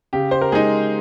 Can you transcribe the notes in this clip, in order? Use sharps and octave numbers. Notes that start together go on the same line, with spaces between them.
C#3 G4
C5
A#4
G#3 D#4 G#4